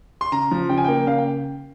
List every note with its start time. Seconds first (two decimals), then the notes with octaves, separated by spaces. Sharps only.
0.21 C6
0.32 C#3 A#5
0.51 F3
0.69 C#3 G5
0.77 G#5
0.84 A#3 G5
1.07 C#3 F5
1.18 G5